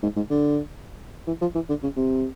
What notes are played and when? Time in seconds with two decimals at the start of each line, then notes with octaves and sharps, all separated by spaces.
0.03 G#2
0.16 G#2
0.30 D3
1.27 E3
1.41 F3
1.55 E3
1.69 D3
1.83 C#3
1.97 C3